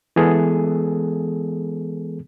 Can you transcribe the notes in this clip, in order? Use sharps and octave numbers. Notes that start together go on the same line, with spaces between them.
E3 G#3 B3 G#4 A4